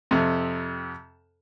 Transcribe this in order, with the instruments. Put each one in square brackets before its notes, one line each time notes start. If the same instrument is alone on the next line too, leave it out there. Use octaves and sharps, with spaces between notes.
[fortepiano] F2 C3